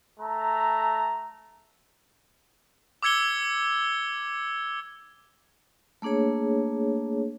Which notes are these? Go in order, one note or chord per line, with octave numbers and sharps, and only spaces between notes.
A3 A#5
D6 E6 G#6 C#7 G7
A3 A#3 D4 G#4 C#5